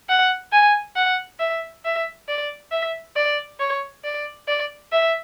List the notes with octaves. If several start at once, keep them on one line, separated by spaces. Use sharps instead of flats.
F#5
G#5
F#5
E5
E5
D5
E5
D5
C#5
D5
D5
E5